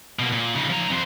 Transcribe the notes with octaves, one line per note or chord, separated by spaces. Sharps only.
B2 A#3
A#2
C#3 D#4
F3 A#5
F2 C5